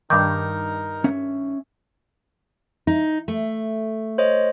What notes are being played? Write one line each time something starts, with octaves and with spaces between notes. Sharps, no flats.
G2 D#3 D#4 A#4 D6 G6
C#4 E5
D#4
A3
C5 C#5 D#5